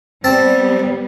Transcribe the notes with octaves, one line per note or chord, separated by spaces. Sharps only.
G3 B3 C4 A5